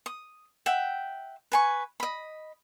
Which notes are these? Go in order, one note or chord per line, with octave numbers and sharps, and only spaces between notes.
D#6
E5 F#5 G5
B4 G#5 C#6
D#5 B5